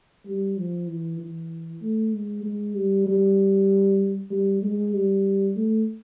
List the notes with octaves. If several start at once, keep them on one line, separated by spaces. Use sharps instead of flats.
G3
F3
E3
E3
A3
G#3
G#3
G3
G3
G3
G#3
G3
A3